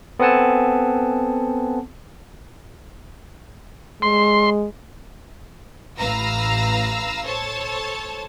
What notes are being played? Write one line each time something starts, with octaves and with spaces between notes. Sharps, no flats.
B3 C4 A4 F#5 G#5 A5
G#3 C6
A1 B4 F5 A#5 E6 A#6
A4 C5 C#5 A5